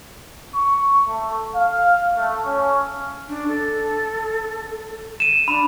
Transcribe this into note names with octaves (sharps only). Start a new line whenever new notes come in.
C#6
A3
F5
A3
C#4
D4
A4
D#7 E7
D4 B5